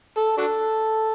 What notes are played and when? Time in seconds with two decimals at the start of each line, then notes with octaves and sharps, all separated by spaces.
0.17 A4
0.38 D4 F#4 A4